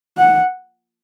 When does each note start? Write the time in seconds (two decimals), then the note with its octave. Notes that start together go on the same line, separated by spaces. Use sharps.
0.18 F#5